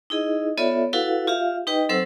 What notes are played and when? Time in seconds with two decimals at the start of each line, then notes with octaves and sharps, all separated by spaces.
0.10 D#4 E4 G#4 D#5
0.58 B3 F4 A4 C#5 D5 E5
0.93 E4 F#4 A4 B4 F5 F#5
1.27 F4 G4 E5 F5
1.67 D#4 G4 B4 D#5 G5
1.89 F#3 C4 A4 C5 F#5 E6